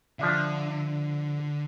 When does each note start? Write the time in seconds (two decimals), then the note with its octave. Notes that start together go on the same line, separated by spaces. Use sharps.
0.19 D3 F3 D4 E5